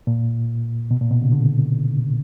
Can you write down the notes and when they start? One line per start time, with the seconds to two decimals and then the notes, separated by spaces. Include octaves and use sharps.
0.07 A#2
0.91 B2
1.01 A#2
1.11 B2
1.22 C#3
1.32 D3